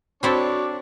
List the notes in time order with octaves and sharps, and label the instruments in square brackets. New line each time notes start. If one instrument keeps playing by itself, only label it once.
[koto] C4 E4 A4 [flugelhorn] D4 [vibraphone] F#4 [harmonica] C#5 D6